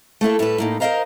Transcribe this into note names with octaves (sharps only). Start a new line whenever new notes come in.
A3 A#3 E4 A4
A2 G3 A4 B4
A2 A#3 D#4
A#4 C5 C#5 D#5 F5 A#5